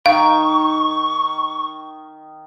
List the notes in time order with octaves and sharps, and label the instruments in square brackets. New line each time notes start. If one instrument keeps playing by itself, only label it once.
[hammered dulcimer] D#3 [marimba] F5 [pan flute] C#6